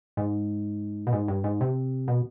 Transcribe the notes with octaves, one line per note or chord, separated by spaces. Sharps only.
G#2
B2
G#2
G2
G#2
C3
B2